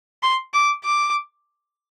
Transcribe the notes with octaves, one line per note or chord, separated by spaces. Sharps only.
C6
D6
D6